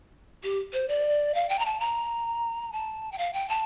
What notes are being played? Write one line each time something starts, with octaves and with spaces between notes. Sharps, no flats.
G4
C5
D5
F5
G5
A#5
A5
A#5
A5
G5
F5
G5
A5